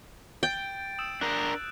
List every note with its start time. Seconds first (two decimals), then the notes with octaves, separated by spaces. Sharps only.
0.43 G5 G6 A6 D7
0.99 D#6 E6 E7
1.21 D4 A#4 F#6